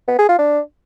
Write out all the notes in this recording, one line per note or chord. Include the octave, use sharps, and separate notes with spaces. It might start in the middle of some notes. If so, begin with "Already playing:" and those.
B3
G#4
F4
D4